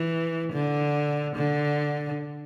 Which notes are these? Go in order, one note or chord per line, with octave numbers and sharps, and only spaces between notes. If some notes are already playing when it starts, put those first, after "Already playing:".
Already playing: E3
D3
D3